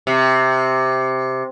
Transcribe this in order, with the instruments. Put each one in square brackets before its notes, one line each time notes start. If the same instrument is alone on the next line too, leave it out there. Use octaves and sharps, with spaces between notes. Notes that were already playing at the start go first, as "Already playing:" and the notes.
[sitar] C3